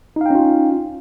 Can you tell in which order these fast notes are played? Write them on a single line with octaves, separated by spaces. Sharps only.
D#4 F5 G5 C#4 F4